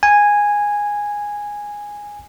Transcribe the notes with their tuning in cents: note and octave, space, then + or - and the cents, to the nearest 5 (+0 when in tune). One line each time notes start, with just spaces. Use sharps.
G#5 -10